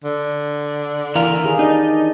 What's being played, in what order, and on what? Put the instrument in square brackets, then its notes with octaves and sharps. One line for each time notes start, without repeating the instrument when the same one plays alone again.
[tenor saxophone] D3
[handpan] E3 [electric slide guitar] E4 A#4 F5
[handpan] D#3 G4 G#4
[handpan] D4 D5 D#5 [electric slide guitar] D#4